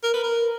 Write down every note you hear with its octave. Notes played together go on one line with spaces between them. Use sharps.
A#4
B4
A#4